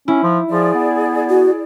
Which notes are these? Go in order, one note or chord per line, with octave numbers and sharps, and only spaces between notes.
C#4 E4
F3
F3 G#4 D5
B3
F#4